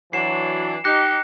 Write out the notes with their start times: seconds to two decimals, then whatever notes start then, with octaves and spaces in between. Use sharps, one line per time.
0.13 E3 F#3 D4 C7 E7
0.84 D#4 G4 F#6 A#6 C#7